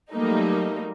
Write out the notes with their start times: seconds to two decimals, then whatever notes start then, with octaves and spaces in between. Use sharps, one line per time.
0.11 F#3 G3 A3 A#3 D#4